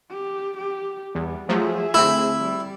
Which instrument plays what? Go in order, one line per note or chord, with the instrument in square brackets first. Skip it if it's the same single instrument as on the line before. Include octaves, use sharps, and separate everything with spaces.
[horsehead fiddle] G4
G4
[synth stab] E2 [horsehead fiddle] G3 B3
[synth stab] F3 F#3 A3 [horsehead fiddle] G#4 E5
[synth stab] D3 A3 C4 [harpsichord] E4
[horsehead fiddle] G3